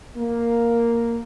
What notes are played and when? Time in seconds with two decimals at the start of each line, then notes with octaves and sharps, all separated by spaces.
0.17 A#3